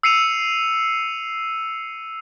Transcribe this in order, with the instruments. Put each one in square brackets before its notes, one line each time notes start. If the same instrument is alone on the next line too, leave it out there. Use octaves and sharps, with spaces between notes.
[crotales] E6 C7 C#7 D#7 F7